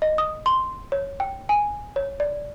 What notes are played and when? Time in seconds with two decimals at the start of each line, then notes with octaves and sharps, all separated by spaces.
0.02 D#5
0.18 D#6
0.46 C6
0.92 C#5
1.20 G5
1.49 G#5
1.96 C#5
2.20 D5